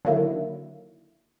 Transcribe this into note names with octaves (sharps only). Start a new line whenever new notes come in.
D3 D#3 F#3 A#3 E4